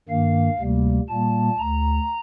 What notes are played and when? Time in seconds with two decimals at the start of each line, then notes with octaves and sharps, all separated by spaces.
0.09 G2 D#3 A#3 F5
0.59 D2 C3 G3 A#3
1.09 A#2 G3 A#3 A5
1.59 D2 A#5